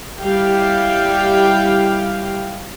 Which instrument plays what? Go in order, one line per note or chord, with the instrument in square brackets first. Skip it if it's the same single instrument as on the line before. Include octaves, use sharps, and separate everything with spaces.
[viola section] G3 E4 G4 F5 G5